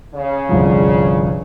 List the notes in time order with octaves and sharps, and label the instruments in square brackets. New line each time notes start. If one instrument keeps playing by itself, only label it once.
[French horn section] C#3
[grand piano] G1 C2 F3